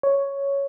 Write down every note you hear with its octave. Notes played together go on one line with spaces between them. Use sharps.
C#5